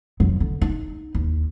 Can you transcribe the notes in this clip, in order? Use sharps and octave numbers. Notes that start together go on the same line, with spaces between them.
F2 F#3
D3
D#4
D#2